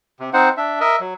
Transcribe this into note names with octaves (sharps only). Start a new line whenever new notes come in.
C3
C4 D#4 C5 F#5
D4 E5
A#4 D#5 E5
F#3